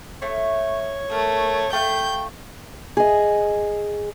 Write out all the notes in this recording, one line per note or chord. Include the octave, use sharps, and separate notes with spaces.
A3 C#5
A3 A#4
A3 F5 G5 G6
G#4 D#5